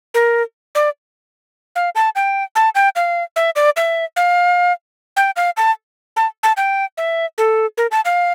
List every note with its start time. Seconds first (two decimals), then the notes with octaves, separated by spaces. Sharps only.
0.14 A#4
0.75 D5
1.76 F5
1.95 A5
2.16 G5
2.55 A5
2.75 G5
2.96 F5
3.36 E5
3.56 D5
3.77 E5
4.16 F5
5.17 G5
5.36 F5
5.57 A5
6.16 A5
6.43 A5
6.57 G5
6.98 E5
7.38 A4
7.77 A#4
7.91 A5
8.05 F5